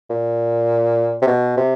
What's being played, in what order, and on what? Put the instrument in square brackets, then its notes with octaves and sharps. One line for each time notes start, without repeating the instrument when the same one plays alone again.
[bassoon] A#2
C3
B2
C3